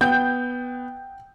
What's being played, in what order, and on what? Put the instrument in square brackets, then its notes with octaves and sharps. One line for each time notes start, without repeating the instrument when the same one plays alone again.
[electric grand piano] B3 [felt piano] F#5 G5 [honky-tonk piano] G6